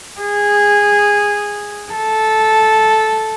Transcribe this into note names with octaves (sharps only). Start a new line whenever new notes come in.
G#4
A4